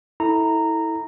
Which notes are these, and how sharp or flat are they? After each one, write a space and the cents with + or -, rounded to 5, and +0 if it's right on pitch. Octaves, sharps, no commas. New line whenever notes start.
E4 -25 A4 +0 A#5 -10